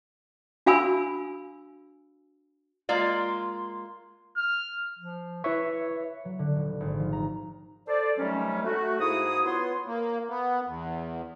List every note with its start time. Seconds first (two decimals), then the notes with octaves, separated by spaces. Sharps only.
0.66 D4 F#4 F5 G#5 B5 E6
2.89 G#3 A#3 F4 D5
4.37 F6
4.99 F3
5.44 E4 B4 C#5 E5 C#6
6.25 F#3
6.39 D3
6.56 D#1
6.80 G#1
6.99 F3
7.13 A#5
7.88 A4 C5 D5
8.18 C3 D#3 F#3 G3 A3 C#4
8.64 A3 F#4
8.99 G#2 A#3 E4 F#4 G#4 D#6
9.46 B3 F4 C#5 C6
9.87 A#3
10.29 B3
10.67 E2